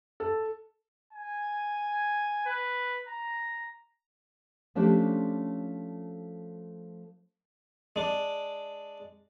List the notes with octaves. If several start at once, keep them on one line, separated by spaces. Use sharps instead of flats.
A4
G#5
B4
A#5
F3 A3 C#4 D4 G4 C5
G#3 D4